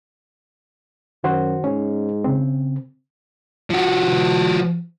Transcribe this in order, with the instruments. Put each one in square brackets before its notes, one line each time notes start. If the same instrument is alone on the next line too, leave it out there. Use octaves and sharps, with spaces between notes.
[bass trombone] F#2 [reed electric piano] D#3 F#4 C5
[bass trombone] G#2 [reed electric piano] C#4
[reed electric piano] C#3 C4
[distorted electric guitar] F3 F#4